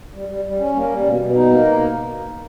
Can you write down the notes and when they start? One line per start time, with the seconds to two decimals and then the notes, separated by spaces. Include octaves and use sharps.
0.14 G3
0.29 G3
0.45 G3
0.59 C#4
0.75 A#3
0.90 G3
1.05 B2
1.20 B2
1.35 D#4
1.50 A#3